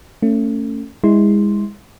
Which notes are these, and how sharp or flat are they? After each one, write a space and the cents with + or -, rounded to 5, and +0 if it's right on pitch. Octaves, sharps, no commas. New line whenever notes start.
A3 +30 C#4 +0
G#3 -25 E4 -25 C6 +0